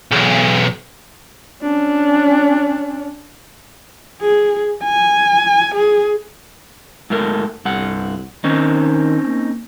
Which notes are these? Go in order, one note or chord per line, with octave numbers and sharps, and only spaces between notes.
B1 E2
C#4 D4
G#4
G#5
G#4
G#2 A3 A#4
C2 G2 F#5
D#3 C4 C#4 D#4
A#3